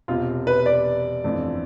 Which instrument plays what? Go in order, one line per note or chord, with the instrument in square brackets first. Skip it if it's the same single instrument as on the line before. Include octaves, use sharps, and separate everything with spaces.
[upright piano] E1 E2 C3 [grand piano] F4
[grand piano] B4
D5
[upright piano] G1 F2 E3 A3 D4